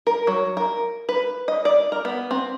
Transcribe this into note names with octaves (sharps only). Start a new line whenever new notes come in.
A#4
F#3
A#4
B4
D#5
D5
A#4
B3
C4